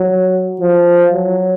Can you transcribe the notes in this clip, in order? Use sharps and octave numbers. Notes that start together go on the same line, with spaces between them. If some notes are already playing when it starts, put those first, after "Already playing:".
Already playing: F#3
F3
F#3